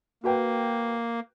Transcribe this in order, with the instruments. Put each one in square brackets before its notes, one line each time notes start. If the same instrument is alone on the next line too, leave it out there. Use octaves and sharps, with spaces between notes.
[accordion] A#3 [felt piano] F#4 B4 G5